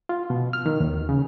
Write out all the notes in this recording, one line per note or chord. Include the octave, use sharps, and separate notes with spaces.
F4
B2
F6
D#3
D#2
C#3